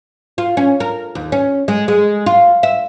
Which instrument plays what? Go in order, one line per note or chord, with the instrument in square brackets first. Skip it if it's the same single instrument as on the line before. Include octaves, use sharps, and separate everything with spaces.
[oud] F4
C#4
A#4
D#2
C#4
G#3
G#3
F4
E5